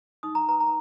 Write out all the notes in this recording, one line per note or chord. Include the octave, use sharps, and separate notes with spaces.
D#4 D#6
A#5
B4 A#5
A#5